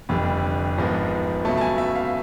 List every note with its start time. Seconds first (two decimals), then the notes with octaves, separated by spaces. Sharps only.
0.09 F1 F2 D3 G3 B5
0.78 G#1 G#2 F3 G#3 B3
1.45 C#2 B2 F#3 A3 A5
1.57 A5
1.61 G#5
1.78 E5
1.96 F5